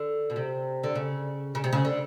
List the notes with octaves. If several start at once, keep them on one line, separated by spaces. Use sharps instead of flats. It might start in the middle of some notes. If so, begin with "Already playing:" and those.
Already playing: D3
B2
C3
D3
C#3
C#3
C3
C#3
D3